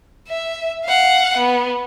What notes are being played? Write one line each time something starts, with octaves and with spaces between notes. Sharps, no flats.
E5
F5 F#5
B3